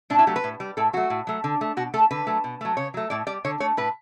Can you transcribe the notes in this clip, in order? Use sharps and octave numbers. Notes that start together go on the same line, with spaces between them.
A2 D4
E4
F#3 A3 G4
B4
A2
G3
A2 A4
F#3 A3 F#4
A2
F#3 A3
D3
A3
B2 F#4
A3 A4
D3 B4
F#3 A3
B2
F#3 A3
C#3 C#5
F#3 A3
A2 D5
G3 D5
D3 C#5
A3 C#5
A2 B4